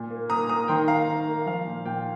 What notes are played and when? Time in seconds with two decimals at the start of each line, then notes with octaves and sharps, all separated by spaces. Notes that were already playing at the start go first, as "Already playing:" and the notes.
Already playing: A#2
0.10 A#3
0.30 A#3 A#5 D#6
0.49 A#3 A#5 D#6
0.68 D#3 G5 C6
0.88 A#3 F5 A#5
1.07 D#3
1.28 A#3
1.46 F3 F5
1.66 A#2
1.85 A#2 G5